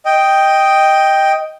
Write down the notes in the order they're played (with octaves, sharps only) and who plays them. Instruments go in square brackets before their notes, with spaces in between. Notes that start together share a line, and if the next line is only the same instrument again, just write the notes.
[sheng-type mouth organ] D#5 G5